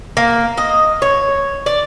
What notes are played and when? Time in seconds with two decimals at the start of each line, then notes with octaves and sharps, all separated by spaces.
0.17 A#3
0.57 D#5
1.02 C#5
1.66 D5